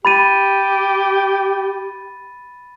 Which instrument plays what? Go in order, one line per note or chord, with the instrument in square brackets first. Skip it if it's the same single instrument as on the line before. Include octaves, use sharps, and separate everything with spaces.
[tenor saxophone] G4 [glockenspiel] B5 A6 D#7